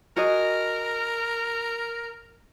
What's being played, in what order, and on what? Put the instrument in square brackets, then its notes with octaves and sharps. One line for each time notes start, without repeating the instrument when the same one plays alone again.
[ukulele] F#4 G#4 D#5 [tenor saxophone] A#4